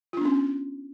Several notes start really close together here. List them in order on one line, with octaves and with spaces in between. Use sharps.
F4 D4 B3 C#4